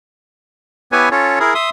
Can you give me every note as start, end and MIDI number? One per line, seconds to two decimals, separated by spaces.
0.92 1.09 59
0.92 1.09 64
0.92 1.09 67
0.92 1.09 71
0.92 1.09 73
0.92 1.09 80
1.11 1.39 61
1.11 1.39 65
1.11 1.39 69
1.11 1.39 73
1.40 1.54 64
1.40 1.54 68
1.40 1.54 70
1.55 1.70 76
1.55 1.70 84
1.55 1.70 87